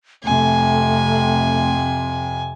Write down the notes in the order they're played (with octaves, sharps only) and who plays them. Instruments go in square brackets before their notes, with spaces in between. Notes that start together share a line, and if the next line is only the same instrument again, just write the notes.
[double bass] F2 C3 [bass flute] A3 [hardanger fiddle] G#5